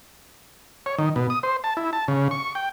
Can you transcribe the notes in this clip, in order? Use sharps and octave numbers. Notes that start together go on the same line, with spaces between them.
C#5
D#3
B2
D#6
C5
A5
E4
A5
C#3
C#6
G5